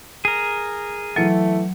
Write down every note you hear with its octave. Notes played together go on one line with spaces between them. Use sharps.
G#4 A#4
E3 F#3 A3 C#7